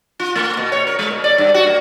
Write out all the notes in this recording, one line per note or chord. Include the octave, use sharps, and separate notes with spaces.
F4
A3
B2
C#5
A#4
G#3
B2
D5
G2
F#4
A#3